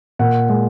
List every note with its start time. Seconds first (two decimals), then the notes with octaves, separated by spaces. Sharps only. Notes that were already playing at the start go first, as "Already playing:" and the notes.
0.19 A#2 F#5
0.49 G#3